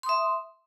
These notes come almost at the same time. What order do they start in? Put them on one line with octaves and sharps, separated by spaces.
C6 D#6 E5